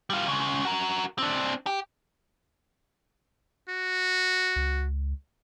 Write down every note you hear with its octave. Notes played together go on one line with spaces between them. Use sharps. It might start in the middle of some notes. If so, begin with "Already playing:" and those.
G3 F4
C#2 C#3
F#4 A#4
C4 D4
G4
F#4
C#2